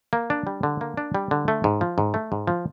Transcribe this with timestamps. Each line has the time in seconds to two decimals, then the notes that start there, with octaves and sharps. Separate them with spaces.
0.13 A#3
0.30 D4
0.47 G3
0.63 D3
0.81 A#3
0.97 D4
1.15 G3
1.31 D3
1.48 A3
1.64 G#2
1.81 F3
1.98 G#2
2.14 A3
2.32 G#2
2.47 F3